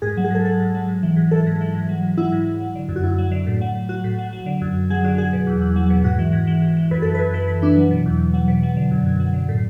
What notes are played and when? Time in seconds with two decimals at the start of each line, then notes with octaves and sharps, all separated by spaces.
0.02 G#2 G#4
0.17 F#3
0.24 G#4
0.31 G#2 A4
0.45 F#3 A4
0.60 G#2
0.75 F#3
0.88 G#2
1.03 E3
1.16 G#2
1.31 E3 A4
1.46 G#2
1.61 E3
1.74 G#2
1.89 F#3
2.02 G#2
2.17 F#3 E4
2.32 G#2
2.46 F#3
2.60 F#3
2.75 D3
2.88 F#2
2.96 F#4
3.03 F#2 E4
3.18 F#3
3.32 D3
3.47 A2
3.61 F#3
3.75 A2
3.89 F#3 F#4
4.04 A2
4.19 F#3
4.33 F#3
4.46 D3
4.61 F#2
4.76 F#2
4.90 F#3 G#4
5.04 D3 F#4
5.18 F#3 G#4
5.33 B2
5.47 E2
5.61 E2
5.76 F#3
5.90 B2
6.04 G#2 F#4
6.19 E3
6.33 G#2
6.47 E3
6.62 G#2
6.77 E3
6.91 F#2 B4
7.02 E3 A4
7.15 B4
7.19 F#2
7.34 E3 B4
7.48 F#2 B4
7.62 E3 D4
7.76 F#3
7.91 B2
8.06 E2
8.19 E2
8.34 F#3
8.48 B2
8.63 F#3
8.76 D3
8.91 F#2
9.06 F#2
9.20 F#3
9.34 D3
9.49 A2